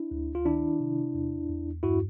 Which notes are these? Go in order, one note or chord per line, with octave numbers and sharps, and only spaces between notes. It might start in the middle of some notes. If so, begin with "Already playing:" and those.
Already playing: D4 E4
D2
F4
D#3 D4 E4
C3
E2
E2
G2 E4 F#4